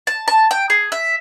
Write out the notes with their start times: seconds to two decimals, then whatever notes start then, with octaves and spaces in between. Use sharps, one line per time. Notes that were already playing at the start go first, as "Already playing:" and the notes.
0.07 A5
0.28 A5
0.51 G5
0.70 G#4
0.92 E5